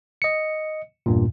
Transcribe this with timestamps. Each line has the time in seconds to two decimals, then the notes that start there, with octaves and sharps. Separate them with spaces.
0.22 D#5 C#7
1.06 E2 G2 A#2